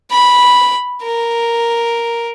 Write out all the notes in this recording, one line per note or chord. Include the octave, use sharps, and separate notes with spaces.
B5
A#4